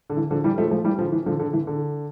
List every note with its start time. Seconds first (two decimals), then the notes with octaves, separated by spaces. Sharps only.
0.10 D3
0.17 E3
0.31 D3 F3
0.44 E3 G3
0.58 F3 A3
0.71 F3 A3
0.84 E3 G3
0.99 D3 F3
1.12 E3
1.26 D3 F3
1.39 D3
1.53 E3
1.67 D3